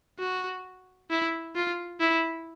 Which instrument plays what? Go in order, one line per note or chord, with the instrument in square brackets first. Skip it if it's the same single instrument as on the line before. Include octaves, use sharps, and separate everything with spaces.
[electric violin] F#4
E4
F4
E4